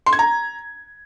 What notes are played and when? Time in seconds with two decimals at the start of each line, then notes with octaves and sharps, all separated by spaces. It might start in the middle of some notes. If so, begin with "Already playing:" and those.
0.06 C6
0.13 G#6
0.19 A#5